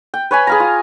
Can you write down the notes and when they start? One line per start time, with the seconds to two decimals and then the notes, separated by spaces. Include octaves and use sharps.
0.14 G5
0.31 B4 C#5 G#5 B5
0.47 G#4 F5 A#5
0.60 F4